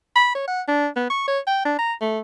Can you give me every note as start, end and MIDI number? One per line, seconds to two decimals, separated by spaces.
0.16 0.30 83
0.35 0.44 73
0.48 0.61 78
0.68 0.87 62
0.96 1.05 59
1.10 1.23 85
1.28 1.39 73
1.47 1.62 79
1.65 1.75 62
1.79 1.93 82
2.01 2.20 57